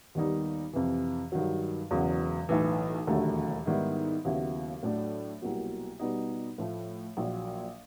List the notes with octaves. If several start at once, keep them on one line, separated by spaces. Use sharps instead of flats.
D#2 D#3 G3 B3 D#4
F2 C3 E3
G2 D#3 F#3
E1 E2 C#3 F#3
B1 A2 E3
E1 D#2 D3 F#3 A3
G#2 D#3 G3 B3 E4
D#2 C#3 F#3 B3 E4
A2 F#3 A3 D4
C2 B2 F#3 A#3
B2 G3 B3 D#4
A2 F3 A3
A#1 A#2 F#3